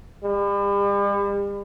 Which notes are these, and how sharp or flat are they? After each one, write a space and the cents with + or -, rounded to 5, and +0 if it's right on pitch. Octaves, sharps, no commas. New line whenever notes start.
G3 +40